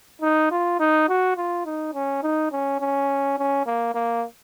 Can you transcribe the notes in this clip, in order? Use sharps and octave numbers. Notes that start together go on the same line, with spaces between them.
D#4
F4
D#4
F#4
F4
D#4
C#4
D#4
C#4
C#4
C#4
A#3
A#3